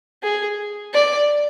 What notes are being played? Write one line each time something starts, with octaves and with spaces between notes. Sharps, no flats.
G#4
D5